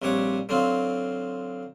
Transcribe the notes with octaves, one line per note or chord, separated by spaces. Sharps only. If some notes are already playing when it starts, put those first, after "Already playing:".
A#1 C3 G3 C#5 F#5
D3 F#3 C4 F4